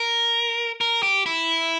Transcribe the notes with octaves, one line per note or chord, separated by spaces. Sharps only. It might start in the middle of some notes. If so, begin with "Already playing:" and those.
Already playing: A#4
A#4
G4
E4